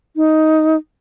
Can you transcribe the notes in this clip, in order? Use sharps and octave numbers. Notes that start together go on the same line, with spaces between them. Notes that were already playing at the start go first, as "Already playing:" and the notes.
D#4